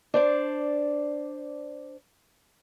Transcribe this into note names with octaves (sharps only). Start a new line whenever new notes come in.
D4 C5 D5